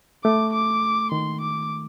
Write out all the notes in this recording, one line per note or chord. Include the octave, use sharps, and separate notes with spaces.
A3 D6
D6
D#3 C6
D6